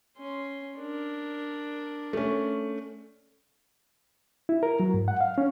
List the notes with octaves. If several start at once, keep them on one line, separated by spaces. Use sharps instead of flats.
C#4 C6
D4 A#4
A3 C#4
E4
A#4
F#3
G#2
F#5
F5
C#4